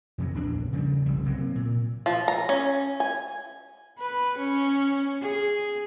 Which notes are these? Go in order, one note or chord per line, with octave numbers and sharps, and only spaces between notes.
F2 C3 F#3
A#1 E2 D4
C#3 F3 G3
F#1 C2 G3
C3 F#3 A#3
A#2
F3
A#5
C#4
G#5
B4
C#4
G#4